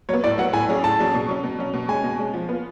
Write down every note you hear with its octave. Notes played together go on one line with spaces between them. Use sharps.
F#3 B3 C#5
A2 D5
F#3 B3 F#5
A2 G#5
F#3 C#4 G#4 D5
A2 A5
F#3 C#4 G#4 D5
B2
F#3 C#4
B2
F#3 C#4
B2
G#3 C#4 G#5
B2
G#3 C#4
F3
B3 F4